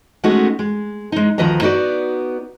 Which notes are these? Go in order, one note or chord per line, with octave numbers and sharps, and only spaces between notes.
G#3 A3 B3 C#4 D#4 F#4
G#3
G#3 D#4
D2 D#3 F3 B4 D#5 A#5
B3 D#4 F#4 B4 D5